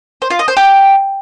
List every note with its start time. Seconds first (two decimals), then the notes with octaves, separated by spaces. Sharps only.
0.22 C5
0.30 F4
0.39 D#5
0.48 C5
0.57 G4